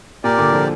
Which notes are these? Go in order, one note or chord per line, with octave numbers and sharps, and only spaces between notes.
A#2 G4 A#4 D5
A#2 D3
D3 F3